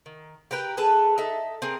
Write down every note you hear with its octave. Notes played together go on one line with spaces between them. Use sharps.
D#3
G4 A#4 B4 G5
G#4 A4 B4 A5
D#4 A4 E5
C4 G#4 A#4